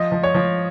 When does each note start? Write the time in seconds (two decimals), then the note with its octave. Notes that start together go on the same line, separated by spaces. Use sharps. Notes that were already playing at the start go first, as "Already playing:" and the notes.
Already playing: F3 D#5
0.12 F3
0.24 C#5
0.35 F3